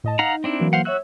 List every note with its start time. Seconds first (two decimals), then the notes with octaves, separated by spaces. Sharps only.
0.04 A2 D#5 A5
0.19 D#4 F5 F#5 A#5
0.44 C4 D4 E4
0.60 E3 F#3 A#3
0.73 C5 F5 F#5
0.85 F#4 C#5 E5 E6 F#6